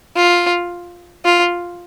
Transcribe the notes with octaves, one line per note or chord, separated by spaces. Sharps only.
F4
F4